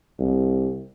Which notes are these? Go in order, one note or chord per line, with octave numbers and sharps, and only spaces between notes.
C2